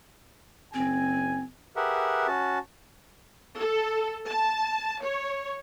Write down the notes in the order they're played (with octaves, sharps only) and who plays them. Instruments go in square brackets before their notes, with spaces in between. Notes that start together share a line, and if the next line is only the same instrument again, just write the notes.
[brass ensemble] F#1 G#4 G#5 [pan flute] C4
[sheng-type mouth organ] G4 G#4 A#4 B4 E5 F#5
C#4 F#4 A5
[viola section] A4
A5
C#5